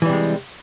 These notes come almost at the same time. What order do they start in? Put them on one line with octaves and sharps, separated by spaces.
E3 G3 C3 G#3